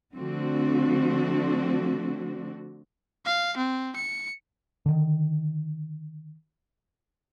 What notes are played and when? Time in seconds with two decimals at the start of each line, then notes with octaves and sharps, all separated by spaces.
0.14 D3 F3 A3 C4 D4 F#4
3.25 F5
3.57 C4
3.96 C#7
4.86 D3 D#3